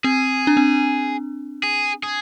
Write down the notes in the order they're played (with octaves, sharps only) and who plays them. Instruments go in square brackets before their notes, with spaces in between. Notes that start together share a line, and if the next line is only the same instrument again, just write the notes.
[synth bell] C4 [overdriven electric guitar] G#4
[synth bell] D4
C4
[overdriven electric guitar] G#4
G#4